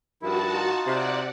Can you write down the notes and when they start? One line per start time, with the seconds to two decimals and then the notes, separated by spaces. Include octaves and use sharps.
0.22 G2 D#3 F3 E4 F#4 A5
0.54 D#4 F4
0.86 C3 D5 F#5